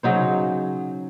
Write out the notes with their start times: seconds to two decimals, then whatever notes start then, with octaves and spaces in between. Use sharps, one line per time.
0.03 C#3 F#3 D#4 C5